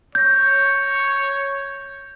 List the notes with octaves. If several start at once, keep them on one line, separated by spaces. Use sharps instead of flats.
C#5 G6 A#6